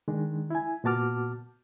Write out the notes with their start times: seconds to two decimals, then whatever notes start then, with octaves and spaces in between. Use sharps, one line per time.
0.08 D#3 G#3 D4
0.50 E4 G#5
0.84 A#2 B3 F#4 A5 D6 F6